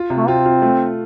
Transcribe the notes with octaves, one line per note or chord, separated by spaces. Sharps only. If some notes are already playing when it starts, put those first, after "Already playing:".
Already playing: F4
C3
A3
C4 F4
F4
A3